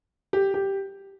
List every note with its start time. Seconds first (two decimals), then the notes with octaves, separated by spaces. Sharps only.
0.33 G4
0.54 G4